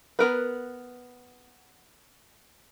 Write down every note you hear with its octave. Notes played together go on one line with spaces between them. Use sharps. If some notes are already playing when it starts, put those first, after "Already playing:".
B3 A#4 B4